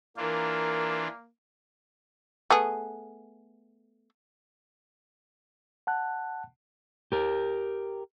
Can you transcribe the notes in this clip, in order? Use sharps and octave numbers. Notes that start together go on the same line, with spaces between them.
E3 A#3 D4 F4 A#4
A3 B3 G#4
F#5 A5 F#6
G4 A#4